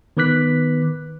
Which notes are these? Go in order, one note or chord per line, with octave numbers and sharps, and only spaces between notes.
D#3 B3 B4 D6 F#6 B6